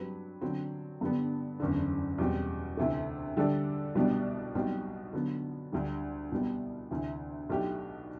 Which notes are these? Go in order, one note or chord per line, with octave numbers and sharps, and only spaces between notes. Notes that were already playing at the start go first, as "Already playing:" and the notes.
Already playing: G2 F#3 C4 G4 B4
D3 F#3 C4
G2 D3 G3 B3
F#1 E2 D3
E2 B2 G3 C4
D2 C3 E3 A3
D3 G3 D4 A4 D5
C2 B2 G3 B3 D4
B1 B2 G3 C4
D3 F#3 B3
D2 D3 G3
C2 B2 G3 B3
D2 C3 E3
B1 B2 A3 D4 G4